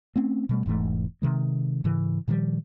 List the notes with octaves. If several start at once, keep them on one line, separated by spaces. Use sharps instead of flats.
A3 C4 C#4
B2 G3 A3
E1 G#2 E3 A3
C3 D#3 G#3
G#2 C#3 E3
A#2 D#3 F3 G3